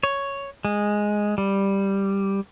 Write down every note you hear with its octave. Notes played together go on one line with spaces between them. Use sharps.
C#5
G#3
G3